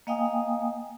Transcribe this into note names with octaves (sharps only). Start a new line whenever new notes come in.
A#3 D#5 F5 G5 G#5 D#6